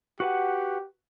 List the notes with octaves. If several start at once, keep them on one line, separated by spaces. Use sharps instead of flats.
F#4 G4 B4 F#5